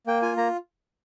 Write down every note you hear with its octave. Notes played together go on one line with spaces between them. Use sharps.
A#3 G5
F4 G#5
A#3 A#5